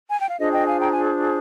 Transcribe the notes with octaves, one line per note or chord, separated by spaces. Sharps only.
G#5
G5
F5
D4 F4 G#4 C5 D#5
D#5 G5
F5 G#5
G5 A#5
G#5